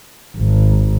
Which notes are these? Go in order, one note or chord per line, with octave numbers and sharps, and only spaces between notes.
G#1